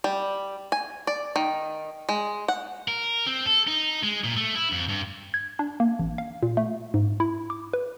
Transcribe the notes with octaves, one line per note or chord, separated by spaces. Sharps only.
G3
G#5
D5
D#3
G#3
F#5
A#4
C4
A4
D#4
G#3
A#2
A3
E4
F2
G2
G#6
D4
A#3
A1
F5
A#2
A3
G#2
E4
D6
B4